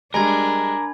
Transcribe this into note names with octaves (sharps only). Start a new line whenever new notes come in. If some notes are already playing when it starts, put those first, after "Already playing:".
G3 G#3 D4 A#4 G#5 B5 G#6